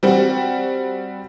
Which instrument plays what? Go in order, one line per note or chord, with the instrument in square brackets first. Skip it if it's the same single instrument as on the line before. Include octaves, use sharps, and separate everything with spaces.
[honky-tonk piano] G3 C4 F#4